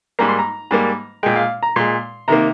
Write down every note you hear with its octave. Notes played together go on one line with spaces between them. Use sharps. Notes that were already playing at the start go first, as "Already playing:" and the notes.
G#2 G3 A#3 A#5
C6
A#5
G#2 G3 A#3
A#2 G#3 G5
F5
A#5
A#2 G#3 C6
C3 D#3 A#3 A#5